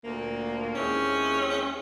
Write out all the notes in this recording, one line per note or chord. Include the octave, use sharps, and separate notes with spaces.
D2 A#2 A#3
D#2 G#3 C4 C#4 E4